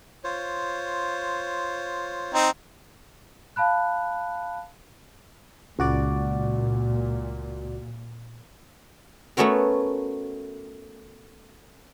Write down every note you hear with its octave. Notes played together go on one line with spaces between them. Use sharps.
F4 C5 C#5
C4 D#4
F5 A5 B5 F#6
C#2 A#2 F#4 D5
A3 B3 C#4 F#4 A#4